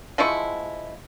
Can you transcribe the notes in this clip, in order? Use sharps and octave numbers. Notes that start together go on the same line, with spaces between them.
F3 G#3 E4 C#6